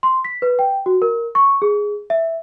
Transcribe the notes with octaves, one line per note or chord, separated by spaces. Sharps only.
C6
B6
B4
G5
F#4
A#4
C#6
G#4
E5